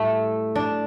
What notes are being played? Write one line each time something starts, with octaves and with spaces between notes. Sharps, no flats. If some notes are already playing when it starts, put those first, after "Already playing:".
Already playing: A2 G3 A3
D4